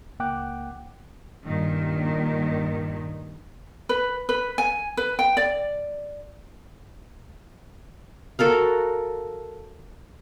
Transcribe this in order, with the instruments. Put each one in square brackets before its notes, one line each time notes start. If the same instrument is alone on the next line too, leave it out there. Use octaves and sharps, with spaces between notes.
[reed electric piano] C#2 A#3 F#5 G5 D6 F#6
[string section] G2 A#2 D#3
[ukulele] B4
B4
G#5
B4
G5
D5
[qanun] F#4 A4 A#4 F5